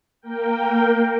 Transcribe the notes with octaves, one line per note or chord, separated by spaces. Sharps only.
A#3 A#4 G5